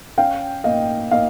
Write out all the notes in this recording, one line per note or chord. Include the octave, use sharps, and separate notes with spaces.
C#4 F5 G5
A#3 D#5 F5
A#3 D#5 F5